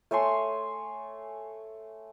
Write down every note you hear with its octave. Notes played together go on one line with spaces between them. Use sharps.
A3 C#5 G#5 C6